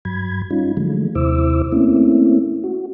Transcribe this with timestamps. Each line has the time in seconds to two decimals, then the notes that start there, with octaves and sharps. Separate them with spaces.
0.05 G2 F#3 B5 G#6
0.51 G3 C#4 D#4 F4
0.77 D3 F3 F#3 G#3 A3
1.15 D#2 C3 E4 C5 D6 E6
1.72 A3 A#3 C4 C#4 E4
2.64 F#4